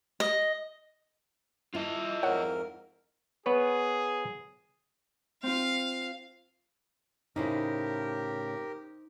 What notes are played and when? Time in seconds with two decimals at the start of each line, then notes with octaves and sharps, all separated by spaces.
0.20 D#5
1.75 E4 F4 D#5
2.23 F2 G#2 A#4 C#5 F#5
3.46 B3 G#4 B4 C#5
5.43 C4 F4 F5
7.36 A2 C#3 D#4 E4 G4 A#4 C5